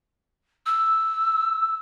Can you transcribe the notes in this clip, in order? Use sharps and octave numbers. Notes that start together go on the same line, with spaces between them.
E6